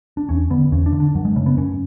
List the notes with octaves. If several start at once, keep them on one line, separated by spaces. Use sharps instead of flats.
D4
E2 C#4
D3 B3
E2 C#4
D4
D3
D4
F#2 F#3
G#3
C#3 A3
B3
F#2 C#4